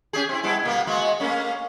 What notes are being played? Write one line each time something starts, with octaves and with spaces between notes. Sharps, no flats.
C#4 G4 G#4
C4 E4
G3 B3 E4
B2 A#3 B3
G#3 B3 F#4
A3 A#3 C#4